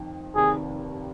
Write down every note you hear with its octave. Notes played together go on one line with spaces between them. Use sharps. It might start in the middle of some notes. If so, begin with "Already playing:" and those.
Already playing: F2 D#3
F1 D#2 D#3 G#4